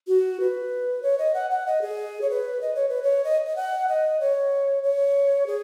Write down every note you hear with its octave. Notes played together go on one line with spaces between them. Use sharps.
F#4
B4
C#5
D#5
F#5
F#5
D#5
G#4
C#5
B4
D#5
C#5
B4
C#5
D#5
D#5
F#5
D#5
C#5
C#5
G#4